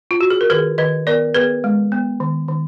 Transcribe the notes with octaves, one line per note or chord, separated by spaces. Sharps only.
F4
F#4
G#4
A#4
D#3 G#4 B4
D#3 B4 D#5
B3 A#4 D5
B3 G#4 B4
G#3
B3
D#3
D#3